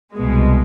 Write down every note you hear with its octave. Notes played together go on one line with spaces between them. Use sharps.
C2 B2 G#3